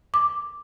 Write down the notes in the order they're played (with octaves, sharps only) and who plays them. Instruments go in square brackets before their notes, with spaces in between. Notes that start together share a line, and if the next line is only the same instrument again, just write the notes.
[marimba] D6